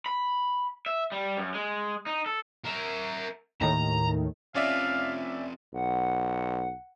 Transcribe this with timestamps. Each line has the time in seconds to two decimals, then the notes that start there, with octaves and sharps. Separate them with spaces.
0.06 B5
0.86 E5
1.12 G3
1.38 F#2
1.54 G#3
2.06 D#4
2.26 A4
2.65 A#4 E5
3.61 D#2 A2 D#3 A#5
4.55 C3 F3 C#4 D5 E5 F5
5.74 B1 F#5